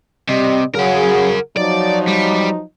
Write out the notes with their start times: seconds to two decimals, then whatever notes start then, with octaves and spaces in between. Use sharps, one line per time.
0.29 C3 G3 D#5
0.75 C#3 F#3 G#4 A#4 F#5
1.57 F3 F#3 D#4 D5
2.08 G3